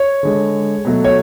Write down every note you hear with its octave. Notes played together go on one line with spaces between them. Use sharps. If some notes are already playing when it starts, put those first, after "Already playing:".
Already playing: C#5
D3 G#3
B2 F#3 A3
C#5